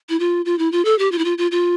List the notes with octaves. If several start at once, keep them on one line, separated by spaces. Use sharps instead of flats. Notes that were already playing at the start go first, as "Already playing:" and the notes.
E4
F4
F4
E4
F4
A4
G4
F4
E4
F4
F4
F4